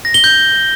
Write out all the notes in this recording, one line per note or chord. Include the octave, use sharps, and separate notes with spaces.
A#6
G7
G6